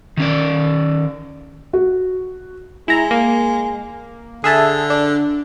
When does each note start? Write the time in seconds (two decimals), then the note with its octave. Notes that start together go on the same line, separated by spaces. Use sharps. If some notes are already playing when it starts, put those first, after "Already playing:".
0.17 D#3 C#4 D5
1.73 F#4
2.88 G#3 E4 A#5
3.11 A#3
4.44 D3 G#4 E5 A5
4.90 D4